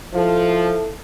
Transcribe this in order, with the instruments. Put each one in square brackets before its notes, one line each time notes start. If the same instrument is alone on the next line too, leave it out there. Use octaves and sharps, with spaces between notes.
[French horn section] F3 [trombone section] E4 A4